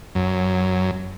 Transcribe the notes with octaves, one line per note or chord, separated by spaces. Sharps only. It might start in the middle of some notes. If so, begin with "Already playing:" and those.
F#2